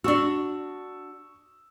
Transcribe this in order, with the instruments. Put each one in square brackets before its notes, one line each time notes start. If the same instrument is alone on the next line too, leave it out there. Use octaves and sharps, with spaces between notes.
[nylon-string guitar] D4 F#4 [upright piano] C#6 E6